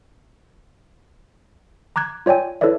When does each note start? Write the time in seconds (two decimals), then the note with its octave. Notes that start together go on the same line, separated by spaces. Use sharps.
1.96 A#5 D6 F#6 G#6
2.26 F4 C#5 D5 G5 G#5
2.61 E4 A4 B4 C#5 D5 E5